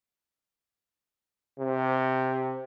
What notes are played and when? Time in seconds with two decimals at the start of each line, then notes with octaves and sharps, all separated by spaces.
1.60 C3